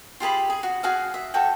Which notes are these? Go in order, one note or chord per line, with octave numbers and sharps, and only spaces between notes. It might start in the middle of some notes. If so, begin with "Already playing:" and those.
F4 G4 G#4 B5
G#4
F#4
F#4 G#4 F5
E5
F#4 A4 G5